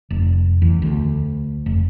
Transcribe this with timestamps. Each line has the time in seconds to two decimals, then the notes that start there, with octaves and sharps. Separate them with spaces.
0.10 F1
0.62 E2
0.82 D2
1.66 F1